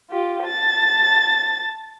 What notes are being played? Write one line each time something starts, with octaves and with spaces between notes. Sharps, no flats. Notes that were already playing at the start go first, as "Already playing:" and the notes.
F4 G4
A5 A6